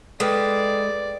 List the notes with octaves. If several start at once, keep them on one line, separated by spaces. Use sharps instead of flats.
G#3 A4 B4 D5 G5